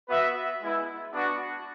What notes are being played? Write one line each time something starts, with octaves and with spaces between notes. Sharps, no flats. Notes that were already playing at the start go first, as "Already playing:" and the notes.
B3 F#4 B4 E5
G#3 B3 E4
B3 D4 F#4